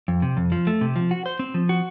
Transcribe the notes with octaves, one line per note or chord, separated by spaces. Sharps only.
F2
C3
F2
F3
A3
C3
F3
F#4
C5
C4
F3
F#4